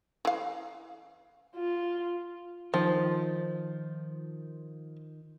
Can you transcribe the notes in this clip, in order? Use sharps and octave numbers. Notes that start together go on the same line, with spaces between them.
E3 F5
F4
D#3 F3